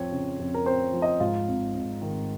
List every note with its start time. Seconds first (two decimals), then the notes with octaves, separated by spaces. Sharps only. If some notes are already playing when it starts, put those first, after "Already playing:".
Already playing: F2 F3 C4 C#5
0.12 C#3
0.40 F2
0.54 A#4
0.66 C4 C5
0.93 F3
1.02 D#5
1.20 G#2 F4
1.48 G#1
1.74 G#1
2.02 D#3